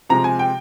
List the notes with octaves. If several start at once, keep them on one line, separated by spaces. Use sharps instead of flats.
C3 F3 G#3 A#5
G#5
G5